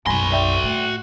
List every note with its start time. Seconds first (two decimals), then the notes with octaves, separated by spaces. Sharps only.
0.06 B1 F#2 F#4 G#5 B5 C6 A#6
0.31 D5 E5 G5
0.63 A2